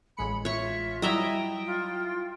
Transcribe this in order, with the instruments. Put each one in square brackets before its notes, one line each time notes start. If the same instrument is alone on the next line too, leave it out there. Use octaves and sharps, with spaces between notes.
[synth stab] A1 G#3 C#7 [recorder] B5
[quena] F4 [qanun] C#5 C#6 [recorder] E5
[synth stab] F#3 G3 E4 [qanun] D#5 E5 A#5 [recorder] G5
[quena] F4